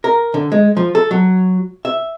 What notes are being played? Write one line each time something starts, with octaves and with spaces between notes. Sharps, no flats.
A#4
D3
G#3
F3
A4
F#3
E5